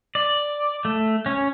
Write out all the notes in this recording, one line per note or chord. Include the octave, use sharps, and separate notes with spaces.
D5
A3
C#4